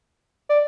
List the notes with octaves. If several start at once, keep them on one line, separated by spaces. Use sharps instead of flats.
D5